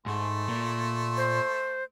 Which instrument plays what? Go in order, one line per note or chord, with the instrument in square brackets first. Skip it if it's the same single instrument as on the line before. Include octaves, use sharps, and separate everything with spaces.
[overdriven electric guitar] G#2 [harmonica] A3 C6
[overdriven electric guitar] A#2
[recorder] C5